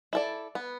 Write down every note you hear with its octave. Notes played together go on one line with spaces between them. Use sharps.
E4 A4 D5
B3